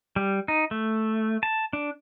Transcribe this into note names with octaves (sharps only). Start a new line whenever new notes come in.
G3
D#4
A3
A5
D4